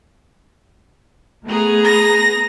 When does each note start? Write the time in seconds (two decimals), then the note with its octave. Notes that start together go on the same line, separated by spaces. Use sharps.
1.47 A3 B3 G#4 A#5
1.84 A#6